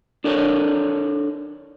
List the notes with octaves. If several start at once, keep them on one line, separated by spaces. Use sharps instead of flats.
D4 A4 A#4 C#5